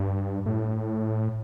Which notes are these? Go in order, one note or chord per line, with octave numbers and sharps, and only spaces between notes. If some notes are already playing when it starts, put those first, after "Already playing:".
Already playing: G2
A2